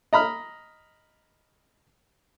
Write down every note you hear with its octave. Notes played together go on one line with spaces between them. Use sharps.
D#5 A#5 B5 F6